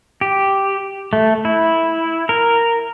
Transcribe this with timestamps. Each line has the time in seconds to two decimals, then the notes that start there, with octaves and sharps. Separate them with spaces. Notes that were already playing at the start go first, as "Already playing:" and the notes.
0.21 G4
1.13 A3
1.45 E4
2.29 A#4